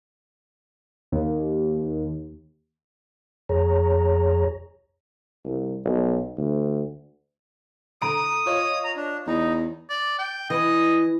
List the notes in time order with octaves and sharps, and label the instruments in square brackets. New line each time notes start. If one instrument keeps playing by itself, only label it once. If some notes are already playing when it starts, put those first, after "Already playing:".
[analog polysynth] D#2
[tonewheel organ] F2 G#4 C#5 A#5
[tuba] C2
B1
D2
[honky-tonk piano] D3 A#5 D7 [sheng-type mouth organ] D#6
[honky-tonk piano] F4 C#5 D#5
[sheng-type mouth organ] A#5
D4
[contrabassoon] E2 [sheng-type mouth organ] D#4
[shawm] D5
G5
[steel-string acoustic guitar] E3 [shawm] D#5